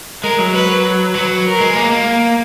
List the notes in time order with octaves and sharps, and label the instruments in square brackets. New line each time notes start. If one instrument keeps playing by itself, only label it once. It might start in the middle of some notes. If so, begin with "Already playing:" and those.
[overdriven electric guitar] G#3 [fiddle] A#4
[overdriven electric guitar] F#3
[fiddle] B4
[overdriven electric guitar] F#3 [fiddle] B4
[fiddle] A#4
[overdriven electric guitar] G#3
A#3
A#3